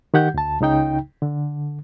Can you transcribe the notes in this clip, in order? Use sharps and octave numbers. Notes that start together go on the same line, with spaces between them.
D#3 G4 F#5 G6
D2 A5
C#2 C#3 D#4 G5
D3